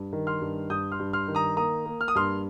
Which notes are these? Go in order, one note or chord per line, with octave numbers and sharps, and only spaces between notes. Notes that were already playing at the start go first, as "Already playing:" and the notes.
Already playing: G2
D#3
C6 F6
G2
G2 D#6 G6
C6 F6
G2
C6 F6
D#3
A#5 D#6
A#3 A#5 D#6
A#3
F6
D#6
G2 C6 F6